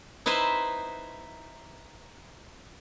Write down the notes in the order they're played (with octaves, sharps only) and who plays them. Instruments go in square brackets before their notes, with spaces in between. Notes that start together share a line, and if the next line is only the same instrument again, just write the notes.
[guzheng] D#4 E4 B4 C5 E5